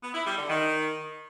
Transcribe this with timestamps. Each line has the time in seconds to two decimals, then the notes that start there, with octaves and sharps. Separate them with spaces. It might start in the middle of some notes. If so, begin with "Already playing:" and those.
0.02 B3
0.14 E4
0.26 G3
0.37 D3
0.49 D#3